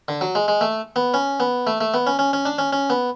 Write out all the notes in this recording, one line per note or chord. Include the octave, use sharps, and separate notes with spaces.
D3
F#3
G#3
G#3
A3
B3
C#4
B3
A3
A3
B3
C#4
C#4
C#4
D4
C#4
C#4
B3